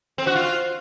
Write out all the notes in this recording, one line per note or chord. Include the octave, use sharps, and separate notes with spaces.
C4
F#4
F4